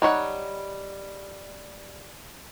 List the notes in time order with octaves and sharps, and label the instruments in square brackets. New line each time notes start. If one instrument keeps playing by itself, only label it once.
[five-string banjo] G3 D#4 C#5 F#5